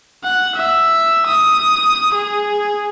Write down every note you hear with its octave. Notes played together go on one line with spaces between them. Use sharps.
F#5
E5
D#6
G#4